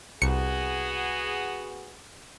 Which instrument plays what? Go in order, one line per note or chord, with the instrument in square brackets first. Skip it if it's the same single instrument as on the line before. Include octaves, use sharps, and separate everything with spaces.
[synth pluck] C2 C#7 [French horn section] B3 F#4 G#4